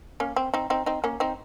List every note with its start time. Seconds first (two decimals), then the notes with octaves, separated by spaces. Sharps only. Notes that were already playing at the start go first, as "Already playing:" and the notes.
0.20 A#3 C#4
0.36 C4
0.54 C4 D#4
0.70 C4 D#4
0.86 C4 D#4
1.04 A#3 C#4
1.20 C4 D#4